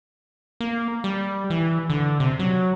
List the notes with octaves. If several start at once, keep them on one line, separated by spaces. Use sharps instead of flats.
A#3
G3
E3
D3
C3
F#3